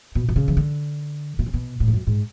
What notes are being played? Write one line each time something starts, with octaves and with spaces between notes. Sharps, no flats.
B2
B2
C#3
E3
D3
B2
C#3
B2
A2
G#2
F#2
G#2